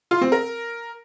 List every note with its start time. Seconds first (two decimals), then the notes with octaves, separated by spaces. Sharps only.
0.11 F4
0.21 C4
0.32 A#4